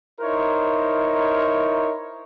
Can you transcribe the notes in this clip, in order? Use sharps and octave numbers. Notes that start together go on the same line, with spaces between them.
D#4 E4 A#4 C5 C#5